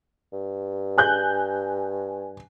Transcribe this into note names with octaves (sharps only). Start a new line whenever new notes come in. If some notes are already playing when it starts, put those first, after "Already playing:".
G2
G#5 F#6 G6